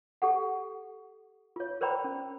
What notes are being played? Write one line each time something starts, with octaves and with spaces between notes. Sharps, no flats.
G4 A4 F#5
F4 C#5
A#4 C5 D5 G5 A#5 B5
C#4